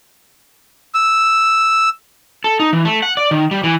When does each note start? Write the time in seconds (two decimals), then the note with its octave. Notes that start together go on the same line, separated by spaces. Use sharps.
0.95 E6
2.44 A4
2.60 D#4
2.73 E3
2.85 A3
3.02 F#5
3.17 D5
3.31 D#3
3.51 G3
3.64 E3